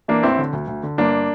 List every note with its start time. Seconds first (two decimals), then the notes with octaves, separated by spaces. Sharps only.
0.08 E3 A#3 D4
0.23 A1 C4 E4
0.38 D3
0.53 D2
0.68 D2
0.83 D3
0.98 G1 A#3 D4